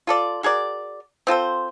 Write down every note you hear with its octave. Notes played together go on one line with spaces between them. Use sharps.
F4 A4 D5
F#4 G#4 A#4 D5
C4 F4 A4 C5